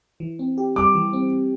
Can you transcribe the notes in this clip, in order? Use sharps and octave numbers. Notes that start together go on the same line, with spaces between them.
E3
C4
G4
G3 D6
E3
C4